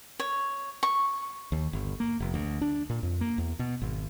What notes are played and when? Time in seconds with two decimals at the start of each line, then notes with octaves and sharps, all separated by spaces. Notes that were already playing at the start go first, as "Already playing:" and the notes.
0.20 C#5
0.83 C#6
1.52 D#2
1.73 G1
2.00 A#3
2.20 F1
2.34 D2
2.61 D4
2.90 A#2
3.03 F2
3.21 A#3
3.38 E2
3.59 B2
3.81 G#1